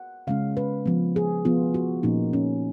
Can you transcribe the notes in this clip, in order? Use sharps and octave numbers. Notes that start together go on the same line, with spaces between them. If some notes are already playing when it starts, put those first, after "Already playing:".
Already playing: F#5
C#3 G#3 C#4 F5
B4
F3 B3
G#4
F3 B3 F4
F#4
A#2 F3 A#3 C#4 D#4
C#4